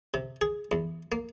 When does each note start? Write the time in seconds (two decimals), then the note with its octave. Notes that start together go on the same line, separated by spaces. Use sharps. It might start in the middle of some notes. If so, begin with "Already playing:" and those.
0.14 C3
0.41 G#4
0.72 E2
1.12 A#3